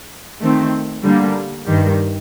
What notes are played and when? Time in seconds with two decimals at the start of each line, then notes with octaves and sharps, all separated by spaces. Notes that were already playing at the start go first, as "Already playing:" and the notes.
0.41 D#3 A3 C4
1.04 D3 G3 A#3
1.65 G2 D#3 G3